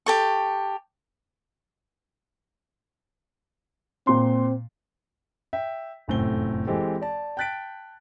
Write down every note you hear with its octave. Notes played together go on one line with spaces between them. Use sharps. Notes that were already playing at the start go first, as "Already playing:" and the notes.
G4 A4 C#6
A#2 C4 C6
E5 G5
F1 F#2 A2 C4 G7
E3 G#3 C4 G4 A4
D5 A5
G5 A5 F#6 A6 B6 D7